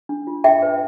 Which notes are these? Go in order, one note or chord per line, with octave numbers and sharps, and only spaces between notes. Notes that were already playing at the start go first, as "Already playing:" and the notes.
D4
F4
D4 E5 G5
B4